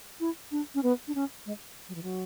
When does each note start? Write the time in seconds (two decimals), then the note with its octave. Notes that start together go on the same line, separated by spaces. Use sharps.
0.20 E4
0.52 D4
0.75 C#4
0.83 B3
1.08 D4
1.15 C#4
1.46 G#3
1.89 F#3
1.95 E3
2.03 F#3